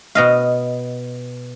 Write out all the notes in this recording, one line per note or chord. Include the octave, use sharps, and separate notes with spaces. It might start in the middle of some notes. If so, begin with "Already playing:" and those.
B2 D#5 F5